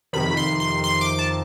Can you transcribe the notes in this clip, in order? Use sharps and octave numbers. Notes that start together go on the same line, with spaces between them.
F2 C3 D#3 B5
C6
C6
C6
D6
A5